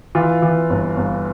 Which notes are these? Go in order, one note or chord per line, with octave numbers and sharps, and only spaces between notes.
E3 F4
E3
G1
G1